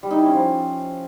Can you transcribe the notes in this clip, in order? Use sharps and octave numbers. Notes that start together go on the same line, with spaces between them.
G3
D#4
E4
C#4
F3